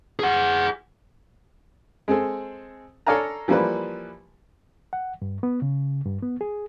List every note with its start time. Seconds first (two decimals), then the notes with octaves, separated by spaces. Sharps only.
0.19 G#4 F#5
2.08 G#3 C4 G#4 A4
3.07 A4 C#5 D5 F5 G#5 A#5
3.48 E3 F3 G3 A#3 A4 B4
4.93 F#5
5.22 G2
5.43 B3
5.62 C#3
6.06 G2
6.23 B3
6.41 G#4